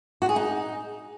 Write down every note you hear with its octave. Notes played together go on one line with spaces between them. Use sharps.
F#4
G#4
D#4